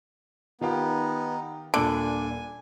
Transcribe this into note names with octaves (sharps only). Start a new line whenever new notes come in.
D#3 B3 D#4 F4 G4
D#1 A#2 D3 D4 G#5 B5